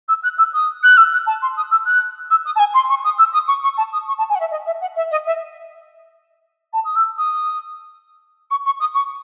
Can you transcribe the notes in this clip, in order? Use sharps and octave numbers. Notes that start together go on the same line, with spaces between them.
E6
F#6
E6
D#6
F#6
E6
F#6
A5
C6
D#6
E6
F#6
E6
D#6
A5
G#5
C6
C#6
D#6
E6
D#6
C#6
C#6
A5
D#6
C#6
A5
G#5
F#5
E5
D#5
E5
F#5
E5
D#5
E5
A5
D#6
E6
D#6
C#6
C#6
D#6
C#6